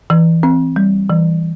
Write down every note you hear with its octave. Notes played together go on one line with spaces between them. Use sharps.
E3
C4
G3
E3